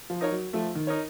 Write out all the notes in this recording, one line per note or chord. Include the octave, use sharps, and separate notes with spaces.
F3
D#4 A#4 C#5
F#3
F3 A3
D#3
D#4 A#4 C#5